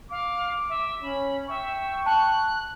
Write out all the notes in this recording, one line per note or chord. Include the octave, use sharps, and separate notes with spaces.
F5 D6
E5
C#4 B5
E5 G5 C#6
A5 F#6